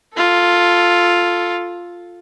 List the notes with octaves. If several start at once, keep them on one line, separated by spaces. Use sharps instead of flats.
F4 A4